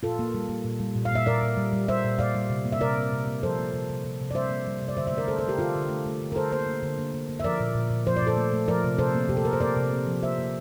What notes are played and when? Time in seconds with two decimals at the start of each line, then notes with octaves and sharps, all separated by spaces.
0.03 A#2 F4 A4
0.19 A#3
0.34 G3
0.49 A#3
0.64 A#2
0.80 G3
0.95 A#2
1.05 F5
1.11 A#2 E5
1.26 A#2 A#4 D5
1.43 A#2
1.57 G3
1.73 G3
1.88 G3 C5 E5
2.04 A#2
2.19 A#2 D5 F5
2.35 G3
2.50 C3
2.65 A#3
2.72 E5
2.81 C3 A#4 D5
2.97 A#3
3.13 C3
3.27 A#3
3.43 F3 A4 C5
3.59 A#3
3.74 C3
3.90 C3
4.05 C3
4.21 C3
4.31 D5
4.35 G3 C5 E5
4.51 A#3
4.67 G3
4.82 C3
4.89 D5
4.97 D3 C5 E5
5.07 C5 E5
5.12 A3
5.17 A#4 D5
5.28 A3 A4 C5
5.38 A4 C5
5.44 A3 G4 A#4
5.59 D3 F4 A4
5.75 D3
5.89 A3
6.06 A3
6.21 D3
6.32 A#4
6.36 D3 A4 C5
6.52 A#3 A4 C5
6.67 A#3
6.83 D3
6.98 A#3
7.14 A#3
7.29 A#3
7.40 E5
7.44 F3 A#4 D5
7.60 A#2
7.75 A#2
7.90 A#2
8.06 F3 C5
8.17 D5
8.22 A#2
8.27 A4 C5
8.37 A3
8.53 A3
8.68 F3 A#4 D5
8.84 C3
8.98 C3 A4 C5
9.14 A#3
9.29 C3 G4
9.37 A4
9.45 C3 A#4
9.53 C5
9.60 A#3 A#4 D5
9.77 C3
9.92 A#3
10.06 F3
10.22 A#3 C5 E5
10.39 A#3